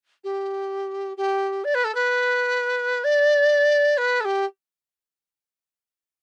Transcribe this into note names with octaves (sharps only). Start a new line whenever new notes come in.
G4
G4
D5
B4
A4
B4
D5
B4
A4
G4